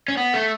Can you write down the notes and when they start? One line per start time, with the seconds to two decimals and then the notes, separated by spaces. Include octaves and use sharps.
0.08 C#4
0.17 B3
0.33 A3